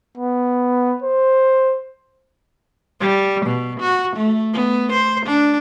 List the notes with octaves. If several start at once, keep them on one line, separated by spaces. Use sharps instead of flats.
B3
C5
G3
B2
F#4
A3
B3
C5
D4